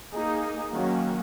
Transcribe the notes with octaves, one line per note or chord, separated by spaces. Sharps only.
A#3 D#4 G#4
D#3 F#3 A#3 C#4 F#4